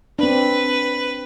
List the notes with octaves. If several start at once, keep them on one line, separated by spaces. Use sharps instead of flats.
C4 D4 B4